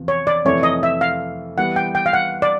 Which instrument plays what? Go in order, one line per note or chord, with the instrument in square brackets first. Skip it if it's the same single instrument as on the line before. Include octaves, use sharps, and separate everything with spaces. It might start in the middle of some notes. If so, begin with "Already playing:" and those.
Already playing: [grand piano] E2 C3 F3
[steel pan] C#5
D5
[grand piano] F2 C3 E3 A3 [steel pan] C#5
[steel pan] D#5
E5
F5
[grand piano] E3 G3 B3 [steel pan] F#5
[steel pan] G5
G5
F5
F#5
D5